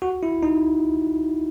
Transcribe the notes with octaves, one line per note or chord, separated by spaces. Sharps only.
F#4
E4
D#4